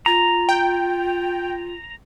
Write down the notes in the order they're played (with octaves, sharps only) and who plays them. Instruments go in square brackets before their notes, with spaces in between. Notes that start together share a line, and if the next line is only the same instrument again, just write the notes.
[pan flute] F4 [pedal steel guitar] A#5
[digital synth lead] G5